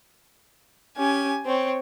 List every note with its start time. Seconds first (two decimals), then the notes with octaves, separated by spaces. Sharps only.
0.97 C#4 G4 G#5
1.45 C4 C5 C#5